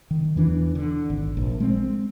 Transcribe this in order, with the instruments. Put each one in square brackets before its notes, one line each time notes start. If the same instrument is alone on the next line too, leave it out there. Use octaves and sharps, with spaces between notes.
[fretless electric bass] D#3
E2 E3 D4
D3
G#1
A#1
G#3 C4